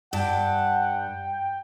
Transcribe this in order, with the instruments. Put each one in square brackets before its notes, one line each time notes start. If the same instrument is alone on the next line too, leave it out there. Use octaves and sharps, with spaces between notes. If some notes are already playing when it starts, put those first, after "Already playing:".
[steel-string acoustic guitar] G2 A5 [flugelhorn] F#5 [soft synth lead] G5